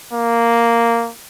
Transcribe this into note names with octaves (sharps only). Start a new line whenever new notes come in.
A#3